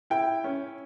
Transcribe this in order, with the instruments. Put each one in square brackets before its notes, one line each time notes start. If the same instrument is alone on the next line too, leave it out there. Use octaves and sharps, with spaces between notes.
[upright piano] E4 G5
C#4